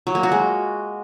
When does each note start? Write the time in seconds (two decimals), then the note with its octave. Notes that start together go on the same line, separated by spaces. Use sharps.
0.07 F#3
0.15 A#3
0.23 F#4
0.32 G#3